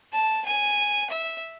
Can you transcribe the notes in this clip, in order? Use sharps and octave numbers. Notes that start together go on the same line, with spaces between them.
A5
G#5
E5